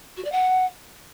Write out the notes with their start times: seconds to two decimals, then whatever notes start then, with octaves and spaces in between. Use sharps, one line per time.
0.17 F#4
0.24 D5
0.32 F#5